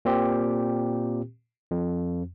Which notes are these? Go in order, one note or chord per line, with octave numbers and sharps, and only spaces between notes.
A#2 C4 G4
F2